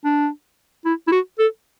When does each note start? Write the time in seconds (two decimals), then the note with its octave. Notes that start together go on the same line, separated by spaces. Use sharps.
0.05 D4
0.85 E4
1.08 E4
1.12 F#4
1.39 A4